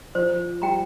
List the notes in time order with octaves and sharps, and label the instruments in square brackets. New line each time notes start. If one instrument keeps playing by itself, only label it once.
[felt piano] F3 [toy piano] C5
[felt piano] G3 [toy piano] G5 A#5